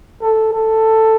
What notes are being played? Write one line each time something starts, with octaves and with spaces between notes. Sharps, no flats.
A4
A4